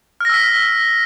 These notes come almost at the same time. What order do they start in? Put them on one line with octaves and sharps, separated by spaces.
F6 A#6 E6 B6